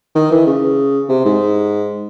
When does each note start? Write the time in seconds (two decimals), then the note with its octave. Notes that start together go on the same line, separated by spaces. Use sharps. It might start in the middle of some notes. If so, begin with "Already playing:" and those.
0.15 D#3
0.31 E3
0.47 C#3
1.09 C3
1.25 G#2